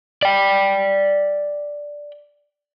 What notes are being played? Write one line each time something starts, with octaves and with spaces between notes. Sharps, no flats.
D5 G5